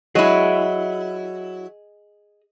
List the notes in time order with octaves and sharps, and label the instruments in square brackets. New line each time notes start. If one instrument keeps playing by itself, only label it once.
[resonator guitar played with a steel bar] F#3 E4 [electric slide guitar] G#4 D#5